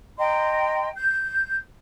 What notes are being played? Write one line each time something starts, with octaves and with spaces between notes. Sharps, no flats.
D#5 G5 A#5 C6
G6